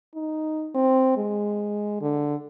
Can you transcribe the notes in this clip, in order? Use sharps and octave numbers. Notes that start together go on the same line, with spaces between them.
D#4
C4
G#3
D3